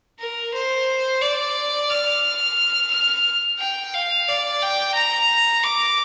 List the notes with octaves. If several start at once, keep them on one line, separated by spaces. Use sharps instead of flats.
A#4
C5
D5
F6
F6
G5
F5
D5
G5
A#5
D6